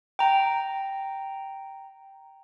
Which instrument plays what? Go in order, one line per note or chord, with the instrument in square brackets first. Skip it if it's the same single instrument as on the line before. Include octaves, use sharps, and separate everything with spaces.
[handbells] G5 A#5